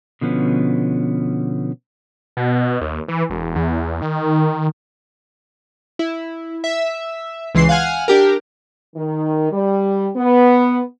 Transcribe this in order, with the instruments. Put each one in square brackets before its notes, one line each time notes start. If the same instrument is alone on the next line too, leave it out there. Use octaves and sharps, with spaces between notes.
[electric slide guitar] B2 D3 F3 B3 C#4
[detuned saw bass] B2
D#2
E3
E1
E2
D#3
[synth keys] E4
E5
C#2 E3 C6 C7
F5 F#5 G#5 F6
D4 G4 A#4
[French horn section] D#3
G3
B3